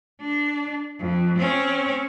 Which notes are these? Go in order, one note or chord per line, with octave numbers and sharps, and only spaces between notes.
D4
F2
C4 C#4